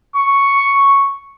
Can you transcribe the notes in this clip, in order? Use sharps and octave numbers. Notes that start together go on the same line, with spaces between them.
C#6